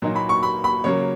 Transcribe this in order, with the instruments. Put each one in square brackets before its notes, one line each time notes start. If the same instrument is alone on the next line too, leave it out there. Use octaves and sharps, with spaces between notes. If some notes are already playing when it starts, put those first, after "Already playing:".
[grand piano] A#2 F#3 A#3 D#4
B5
C#6
B5
B5
C#3 F#3 A#3 C#5